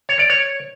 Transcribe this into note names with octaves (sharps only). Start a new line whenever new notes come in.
C#5
D5
C#5